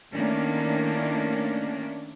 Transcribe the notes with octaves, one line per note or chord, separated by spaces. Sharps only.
D#3 A3 A#3 C#4 D4 E4